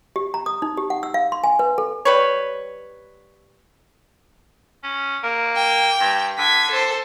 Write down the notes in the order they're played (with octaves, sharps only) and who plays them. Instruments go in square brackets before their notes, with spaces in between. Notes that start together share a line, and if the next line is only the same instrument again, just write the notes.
[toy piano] G4
A#5
D#6
D#4
G4
F#5
E6
F5
C6
G#5
B4
A4
[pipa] G3 B4 C#5
[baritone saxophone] C#4
A#3
[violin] G5
[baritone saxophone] G2
[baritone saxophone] D3 [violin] G#6 B6
[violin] A4 C5